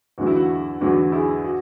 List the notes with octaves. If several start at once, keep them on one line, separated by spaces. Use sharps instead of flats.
E2 D3 F#3 F#4
E4
F#4
E2 D3 F#3 F#4
E4 G#4
F#4